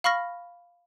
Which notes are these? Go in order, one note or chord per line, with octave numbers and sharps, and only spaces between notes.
F5 B5 C#6 F6 A#6